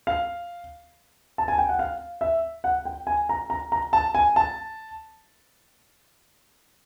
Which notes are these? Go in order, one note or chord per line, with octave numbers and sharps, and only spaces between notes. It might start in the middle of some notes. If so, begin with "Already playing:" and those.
F5
A5
G#5
G5
F#5
F5
E5
F#5
G5
G#5
A#5
A#5
A#5
A5
G#5
A5